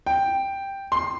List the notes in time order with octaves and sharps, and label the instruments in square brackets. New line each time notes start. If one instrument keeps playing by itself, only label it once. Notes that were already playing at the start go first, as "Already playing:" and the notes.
[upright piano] G5
C6